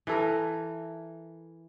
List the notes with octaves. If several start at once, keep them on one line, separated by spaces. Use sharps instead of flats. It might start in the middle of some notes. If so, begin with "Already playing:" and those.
E3 A4 A#4